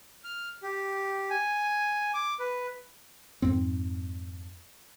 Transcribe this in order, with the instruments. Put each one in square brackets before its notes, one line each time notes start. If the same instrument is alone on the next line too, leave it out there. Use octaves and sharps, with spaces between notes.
[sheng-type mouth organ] F6
G4
G#5
D6
B4
[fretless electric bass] F2 G#2 C4